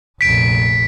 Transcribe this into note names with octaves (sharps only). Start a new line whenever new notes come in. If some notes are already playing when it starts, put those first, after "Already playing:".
F1 A#1 B6 D7